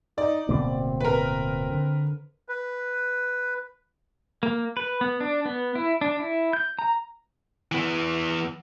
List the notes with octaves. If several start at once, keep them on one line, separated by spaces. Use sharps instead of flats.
D#4 D5
D1 B2 A#3 C4
A#4 B4
D3
B4
A#3
B4
B3
D4
B3
E4
D4
E4
G6
A#5
E3 B3